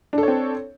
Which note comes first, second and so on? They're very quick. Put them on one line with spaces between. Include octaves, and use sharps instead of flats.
D4 A4 C#5 C4